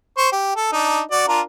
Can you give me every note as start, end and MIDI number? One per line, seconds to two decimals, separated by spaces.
0.18 0.27 72
0.18 0.27 85
0.32 0.52 67
0.56 0.68 69
0.72 1.01 62
0.72 1.01 63
1.11 1.25 66
1.11 1.25 74
1.28 1.41 62
1.28 1.41 65
1.28 1.41 70